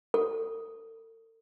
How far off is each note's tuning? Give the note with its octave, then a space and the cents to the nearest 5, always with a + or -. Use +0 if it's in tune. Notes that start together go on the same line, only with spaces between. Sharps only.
A4 +45